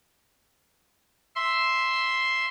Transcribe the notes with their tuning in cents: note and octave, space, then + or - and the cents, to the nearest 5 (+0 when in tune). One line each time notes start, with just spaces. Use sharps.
E5 +0 C6 +0